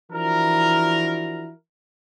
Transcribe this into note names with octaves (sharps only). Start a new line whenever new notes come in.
E3 F3 D4 E4 F#4 A#4